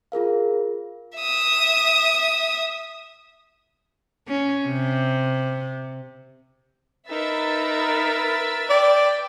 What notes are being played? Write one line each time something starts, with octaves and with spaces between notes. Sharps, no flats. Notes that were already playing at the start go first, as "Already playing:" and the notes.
F4 G#4 A#4 F5
E5 D#6
C#4
C3
D#4 A#4 B4 E5 A6
D5 G5